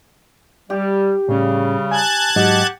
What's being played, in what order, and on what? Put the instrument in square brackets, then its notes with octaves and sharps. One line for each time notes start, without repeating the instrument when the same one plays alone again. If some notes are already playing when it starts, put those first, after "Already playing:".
[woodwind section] G3 [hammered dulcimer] G4
[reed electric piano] A2 C#4 [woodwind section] C#3 G3
[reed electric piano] G#5 [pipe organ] A5 F#6 G#6
[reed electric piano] G#2 F#3 D#5 [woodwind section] G4 F#5